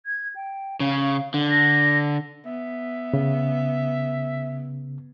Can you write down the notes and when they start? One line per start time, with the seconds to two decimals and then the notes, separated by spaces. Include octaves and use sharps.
0.06 G#6
0.36 G5
0.80 C#3 F5
1.34 D3
1.51 A#6
2.46 B3 E5
3.14 C#3